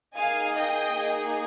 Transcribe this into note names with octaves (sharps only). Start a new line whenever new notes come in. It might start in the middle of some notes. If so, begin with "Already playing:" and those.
A#3 D#4 G#4 F5 G#5
D#5 G5
A#3 D#4 G#4